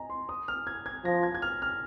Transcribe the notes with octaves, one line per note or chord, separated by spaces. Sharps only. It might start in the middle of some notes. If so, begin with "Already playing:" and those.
Already playing: D#5 G#5 A#5
C6
D#6
F6
G#6
G#6
F3 A#6
G#6
G#6
F6
F6